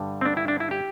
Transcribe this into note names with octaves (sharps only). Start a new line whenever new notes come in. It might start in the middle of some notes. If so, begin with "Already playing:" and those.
Already playing: G2 D3 G3
C4
D4
E4
D4
E4
G4